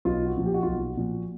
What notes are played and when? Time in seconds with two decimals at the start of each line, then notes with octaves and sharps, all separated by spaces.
0.05 B1 F4
0.26 F#4
0.36 A#2 F3
0.46 G4
0.54 F#4
0.63 F4
0.67 B1 F#4
0.97 A#2 F3